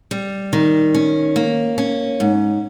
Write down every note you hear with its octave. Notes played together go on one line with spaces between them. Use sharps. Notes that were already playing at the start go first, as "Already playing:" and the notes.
G3
D#3
C#4
A#3
C#4
G#2